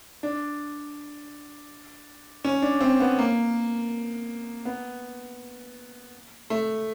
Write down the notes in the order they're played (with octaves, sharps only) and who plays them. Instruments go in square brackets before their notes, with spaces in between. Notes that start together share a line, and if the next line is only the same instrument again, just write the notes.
[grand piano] D4
C#4
D4
C4
B3
A#3
B3
A3